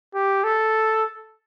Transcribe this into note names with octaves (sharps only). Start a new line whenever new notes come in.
G4
A4